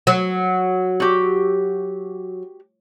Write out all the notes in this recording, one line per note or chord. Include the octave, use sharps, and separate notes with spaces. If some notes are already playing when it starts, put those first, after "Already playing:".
F#3
F#4 G4